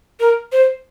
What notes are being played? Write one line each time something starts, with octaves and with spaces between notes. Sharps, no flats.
A#4
C5